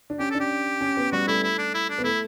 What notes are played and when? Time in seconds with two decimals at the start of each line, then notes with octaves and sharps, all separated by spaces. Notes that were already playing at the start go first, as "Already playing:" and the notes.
0.10 D4
0.19 C#4 G4
0.31 D4 A4
0.40 G4
0.81 C#4
0.97 B3
1.12 G3 F#4
1.28 A3 E4
1.43 E4
1.58 D4
1.74 E4
1.90 D4
1.99 B3
2.04 A3 E4